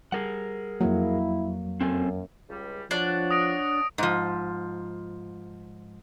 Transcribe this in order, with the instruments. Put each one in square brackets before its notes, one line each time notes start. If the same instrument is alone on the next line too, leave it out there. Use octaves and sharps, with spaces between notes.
[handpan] G3 [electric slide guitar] G#4 A#4 F#5
[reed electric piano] F2 F#3 [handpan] A#3 [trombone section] E4
[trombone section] F#2 [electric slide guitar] C4 A4 G#5
[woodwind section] C#2 G3
[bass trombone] F3 [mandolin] D4 [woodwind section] C#5 F#5
[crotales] D#6 A#6 D7
[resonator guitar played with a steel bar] G#2 F3